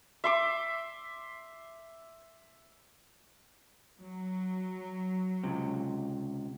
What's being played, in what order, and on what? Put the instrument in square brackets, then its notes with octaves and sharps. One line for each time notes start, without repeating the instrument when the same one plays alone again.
[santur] E5 C6 D6
[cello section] F#3
[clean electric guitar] C#2 C3